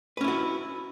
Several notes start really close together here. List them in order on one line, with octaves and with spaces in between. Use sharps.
B4 C#4 E4 F#4